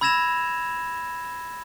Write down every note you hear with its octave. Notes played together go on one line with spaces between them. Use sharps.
B5 E6 G#6 A#6 E7 F7